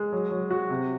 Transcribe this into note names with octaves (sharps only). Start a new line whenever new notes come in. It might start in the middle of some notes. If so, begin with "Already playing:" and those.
Already playing: G#3
F#3
F#3
F#4
C3